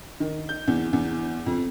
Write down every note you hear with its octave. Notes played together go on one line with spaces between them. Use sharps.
D#3
G6
E2
E2
F2